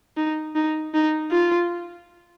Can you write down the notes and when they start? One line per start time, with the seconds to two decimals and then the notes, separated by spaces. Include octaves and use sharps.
0.17 D#4
0.55 D#4
0.94 D#4
1.32 F4